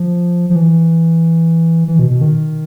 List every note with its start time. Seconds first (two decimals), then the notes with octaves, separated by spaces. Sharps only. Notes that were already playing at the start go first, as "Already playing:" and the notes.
Already playing: F3
0.50 F3
0.56 E3
1.88 E3
1.99 B2
2.10 B2
2.21 D#3